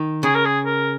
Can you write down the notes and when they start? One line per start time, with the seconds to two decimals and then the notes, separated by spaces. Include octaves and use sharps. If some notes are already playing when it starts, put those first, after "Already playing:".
Already playing: D#3
0.23 C#3 G#4
0.35 A#4
0.46 G#4
0.65 A#4